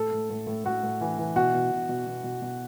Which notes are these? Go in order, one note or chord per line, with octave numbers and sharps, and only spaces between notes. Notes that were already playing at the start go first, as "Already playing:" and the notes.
Already playing: A2 A4
A2
A2
A2
A2 F#4
A2
E3
E3
B2 F#4
B2
B2
B2
B2
B2
B2